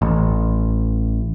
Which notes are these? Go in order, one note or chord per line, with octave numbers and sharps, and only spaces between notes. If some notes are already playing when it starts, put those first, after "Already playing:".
A1